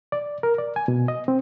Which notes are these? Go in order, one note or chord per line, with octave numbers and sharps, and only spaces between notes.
D5
A#4
D5
G#5
B2
D#5
C4